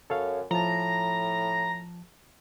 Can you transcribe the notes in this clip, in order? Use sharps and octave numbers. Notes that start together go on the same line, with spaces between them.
F#2 A4 C#5 F5
A2 F3 A5 A#5